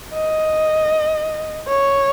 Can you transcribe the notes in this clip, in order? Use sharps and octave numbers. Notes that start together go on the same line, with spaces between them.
D#5
C#5